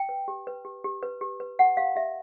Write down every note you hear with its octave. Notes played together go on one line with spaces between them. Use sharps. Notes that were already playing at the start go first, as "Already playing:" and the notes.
Already playing: G5
B4
G4
B4
G4
G4
B4
G4
B4
G4 F#5
G4 F5
G4 E5